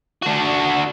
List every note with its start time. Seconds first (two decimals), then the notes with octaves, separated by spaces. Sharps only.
0.23 D4 F#4